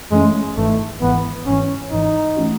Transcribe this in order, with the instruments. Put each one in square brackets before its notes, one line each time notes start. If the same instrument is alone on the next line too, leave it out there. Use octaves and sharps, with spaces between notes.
[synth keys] F#2 E3 A3 C#4 [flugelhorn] G#3
[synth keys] G#1 G#2 E3 [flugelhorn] A3
[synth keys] G#1 G#2 E3 [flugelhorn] B3
[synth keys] G#1 G#2 E3 [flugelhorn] C#4
[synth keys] G#1 G#2 E3 [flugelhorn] D#4
[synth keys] E3 A3 C#4 F#4